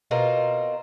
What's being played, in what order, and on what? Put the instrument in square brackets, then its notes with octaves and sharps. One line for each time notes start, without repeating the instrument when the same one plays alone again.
[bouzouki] B2 C4 F4 A#4